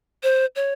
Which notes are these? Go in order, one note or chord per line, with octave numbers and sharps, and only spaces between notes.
C5
C#5